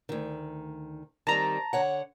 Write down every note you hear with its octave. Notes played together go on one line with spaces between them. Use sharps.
D2 D#3
D#3 G3 C4 A5 A#5
D3 C#5 F#5